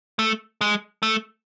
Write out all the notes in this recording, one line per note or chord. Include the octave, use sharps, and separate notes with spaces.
A3
G#3
A3